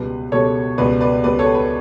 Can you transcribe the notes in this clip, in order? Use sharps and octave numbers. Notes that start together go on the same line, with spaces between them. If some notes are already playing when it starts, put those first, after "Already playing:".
Already playing: C#2 B2 G3 B4
C#2 B2 G3 A4 C#5
C#2 B2 G3 B4 D5
B4 D5
C#2 B2 G3 B4 D5
A4 C#5
B4